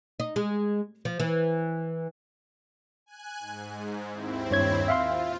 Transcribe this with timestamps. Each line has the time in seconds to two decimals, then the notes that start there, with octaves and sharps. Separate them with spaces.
0.20 D#4
0.36 G#3
1.05 F3
1.20 E3
3.06 G#5 F#6
3.39 G#2
4.10 D#2 C4 E4
4.51 G2 C#5 G#6
4.88 F4 E5 F5 C6